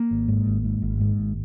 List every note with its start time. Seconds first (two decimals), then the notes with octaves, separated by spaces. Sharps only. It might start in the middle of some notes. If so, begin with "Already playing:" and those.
Already playing: A#3
0.11 G#1
0.28 G#2
0.46 G#1
0.64 G#2
0.82 G#1
1.01 G#2
1.18 G#1